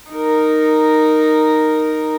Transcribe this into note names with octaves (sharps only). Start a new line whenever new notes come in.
D#4 A#4